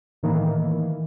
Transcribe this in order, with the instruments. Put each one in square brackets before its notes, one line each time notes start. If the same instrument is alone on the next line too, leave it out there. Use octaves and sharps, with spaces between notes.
[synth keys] A2 D#3 E3 A#3